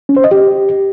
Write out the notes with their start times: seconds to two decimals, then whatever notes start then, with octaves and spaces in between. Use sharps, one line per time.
0.09 C#4
0.17 C5
0.24 D#5
0.31 G4